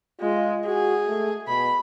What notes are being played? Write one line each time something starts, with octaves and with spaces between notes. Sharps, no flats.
G#3 F4
F#4 G#4
A3
B2 B5